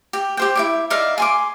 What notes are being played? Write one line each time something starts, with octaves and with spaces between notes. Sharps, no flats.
G4
G4 C5 G5
E4 C#5 D6
D#4 D5 E5 F5
G#5 C6 D6